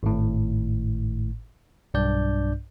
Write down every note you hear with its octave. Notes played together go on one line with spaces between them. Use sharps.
G#1 A2
B1 G2 D4 D5 G6